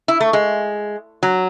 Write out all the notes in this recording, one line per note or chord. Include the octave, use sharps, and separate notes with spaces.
E4
A3
G#3
F#3